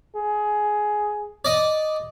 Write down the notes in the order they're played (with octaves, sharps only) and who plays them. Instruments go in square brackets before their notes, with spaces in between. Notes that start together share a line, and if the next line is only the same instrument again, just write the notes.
[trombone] G#4
[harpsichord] D5 D#5